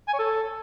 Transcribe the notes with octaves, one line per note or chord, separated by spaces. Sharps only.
G#5
C#5
A4